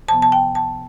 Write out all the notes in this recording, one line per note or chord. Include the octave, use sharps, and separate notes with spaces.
C3 F3 B3 A5
A5
G5
A5